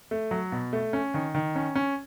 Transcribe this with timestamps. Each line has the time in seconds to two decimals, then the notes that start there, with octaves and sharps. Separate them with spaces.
0.11 A3
0.31 F#3
0.52 B2
0.73 A3
0.93 C#4
1.14 D#3
1.35 D#3
1.56 C#4
1.76 C#4